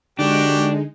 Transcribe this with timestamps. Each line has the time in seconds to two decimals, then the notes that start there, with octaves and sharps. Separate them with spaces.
0.19 D3 G#3 D4 D#4 F#4 G4